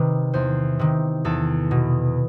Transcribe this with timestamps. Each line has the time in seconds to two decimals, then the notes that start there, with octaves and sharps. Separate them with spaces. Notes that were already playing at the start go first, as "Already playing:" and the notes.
Already playing: C3 D#3 B4
0.34 E2 C5
0.79 C3 D#3
1.25 E2 A4
1.71 B2